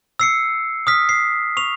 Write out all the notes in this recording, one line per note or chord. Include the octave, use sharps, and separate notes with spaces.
E6 C7 C#7
D#6 F6 B6
C7
C#6 F7